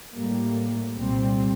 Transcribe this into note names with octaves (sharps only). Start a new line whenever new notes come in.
A2 G3 A#3
C2 A#2 G3 C4